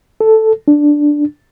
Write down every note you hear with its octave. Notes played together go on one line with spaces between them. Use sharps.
A4
D4